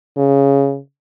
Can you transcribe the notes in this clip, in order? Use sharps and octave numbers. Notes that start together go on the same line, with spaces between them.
C#3